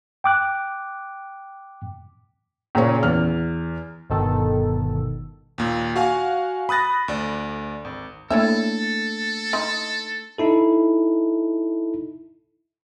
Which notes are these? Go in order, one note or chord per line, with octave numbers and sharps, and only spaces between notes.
G5 D6 F#6
A#2 C#3 C#4 C#5
E2 F6
G1 B2 D#3 A4
D#2 A#2
F#4 F5 G#5
B5 D#6 F#6 A6 A#6
D2 D5
G#1
A3 A#3 D4 E4 A4 C#5 E5
D#4 C6
D#4 E4 A4